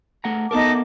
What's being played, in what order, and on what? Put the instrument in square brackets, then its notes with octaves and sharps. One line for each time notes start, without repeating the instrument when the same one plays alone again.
[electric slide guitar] A3 F#5 A#5
[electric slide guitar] B3 A4 A#4 [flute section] D#4 A5 D6